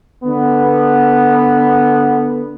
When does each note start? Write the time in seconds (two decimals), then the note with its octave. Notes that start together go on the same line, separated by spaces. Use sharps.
0.24 D3 B3